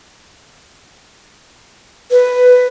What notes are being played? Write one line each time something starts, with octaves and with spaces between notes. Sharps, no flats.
B4